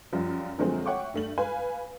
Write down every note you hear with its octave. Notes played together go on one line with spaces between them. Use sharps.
F#2 F3 G3
D3 F3 F#3 G#3 A3 C4
C#5 E5 F#5 G5 C#6 D6
G2 A3 F#7
B4 F5 G#5